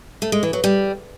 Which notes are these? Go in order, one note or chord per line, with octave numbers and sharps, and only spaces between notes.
A3
G#3
E3
F#3
G3